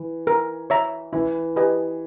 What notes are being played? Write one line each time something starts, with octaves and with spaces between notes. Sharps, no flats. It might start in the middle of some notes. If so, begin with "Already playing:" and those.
Already playing: E3
A#4
C#5 E5 A#5
E3 E4
G4 B4 D#5 G#5